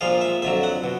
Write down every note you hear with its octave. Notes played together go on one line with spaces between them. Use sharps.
A#1 A#2 F3 G#3 F5
E5
F2 D3 F#3 E5
F#5
B2